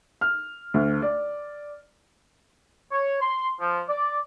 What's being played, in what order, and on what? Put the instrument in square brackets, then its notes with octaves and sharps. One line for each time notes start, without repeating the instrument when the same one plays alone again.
[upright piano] F6
D2
D5
[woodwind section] C#5
C6
F3
D5